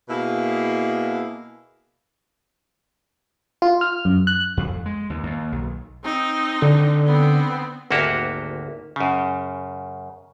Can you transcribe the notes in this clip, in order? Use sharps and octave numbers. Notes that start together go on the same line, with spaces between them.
B2 A#3 E4 G#4
F4
F6
F#2
F#6
F2
G#3
D#2
D#2
B1
C4 D#4
D3
B3 C4
G#1 D2 A#3 F#4 G4
F#2 C#3